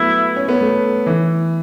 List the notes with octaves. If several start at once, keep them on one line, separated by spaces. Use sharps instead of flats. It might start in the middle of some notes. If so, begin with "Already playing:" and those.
Already playing: F#3 A3 B3 E4
C#4
B3
A3
E3